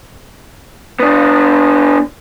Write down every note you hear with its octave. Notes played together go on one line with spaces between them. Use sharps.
B3 D4